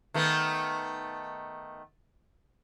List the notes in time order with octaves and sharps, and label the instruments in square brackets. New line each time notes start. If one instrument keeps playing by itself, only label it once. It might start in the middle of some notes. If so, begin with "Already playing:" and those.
[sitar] D#3 A3 B3